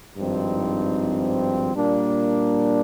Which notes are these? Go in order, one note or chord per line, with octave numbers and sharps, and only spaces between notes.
G#1 G2 F3 C4 D#4
A#2 G3 A#3 D4